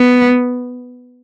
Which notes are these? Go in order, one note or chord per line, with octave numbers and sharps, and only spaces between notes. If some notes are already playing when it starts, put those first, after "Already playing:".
Already playing: B3